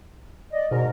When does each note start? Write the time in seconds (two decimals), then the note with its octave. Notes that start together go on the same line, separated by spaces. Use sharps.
0.52 D5 D#5
0.71 G#2 B2 A#4